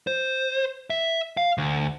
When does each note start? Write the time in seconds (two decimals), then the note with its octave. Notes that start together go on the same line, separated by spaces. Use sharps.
0.07 C5
0.90 E5
1.37 F5
1.58 D2